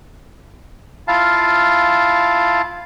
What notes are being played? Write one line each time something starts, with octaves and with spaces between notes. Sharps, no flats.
E4 F4 F5 A5